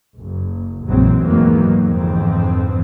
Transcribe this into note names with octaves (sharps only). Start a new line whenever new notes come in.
F#1
A#1 F#2 E3 F#3 G#3 C4
F1 E2 G#2 D#3 F#3 A#3
G1 F2 G#2 E3 F3 C4